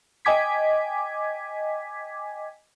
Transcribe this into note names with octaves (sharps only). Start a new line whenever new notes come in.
D#5 G5 G#5 D6 G#6 B6